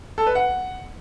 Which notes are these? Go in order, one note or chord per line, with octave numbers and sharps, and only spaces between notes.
A4
B4
F#5